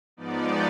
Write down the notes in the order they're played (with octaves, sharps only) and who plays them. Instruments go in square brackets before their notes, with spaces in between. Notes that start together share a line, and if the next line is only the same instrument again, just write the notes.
[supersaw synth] G#2 F3 B3 D#4 D5